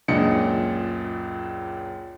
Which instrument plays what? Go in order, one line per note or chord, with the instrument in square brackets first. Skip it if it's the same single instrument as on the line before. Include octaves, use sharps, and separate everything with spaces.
[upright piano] C#2 F#2 A#2 D4 D#5 C#7